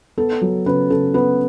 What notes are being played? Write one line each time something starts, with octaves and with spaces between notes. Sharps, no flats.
B3 A4
F#3
C#3 B4
C#3 A4
B3 B4